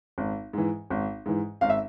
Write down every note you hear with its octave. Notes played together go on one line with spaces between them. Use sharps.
G#1
G#2 E3
G#1
G#2 E3
G#1 F5
E5